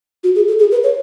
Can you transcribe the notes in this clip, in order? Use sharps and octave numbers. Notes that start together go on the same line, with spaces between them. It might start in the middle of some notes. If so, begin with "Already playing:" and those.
F#4
G#4
A4
G#4
B4
C#5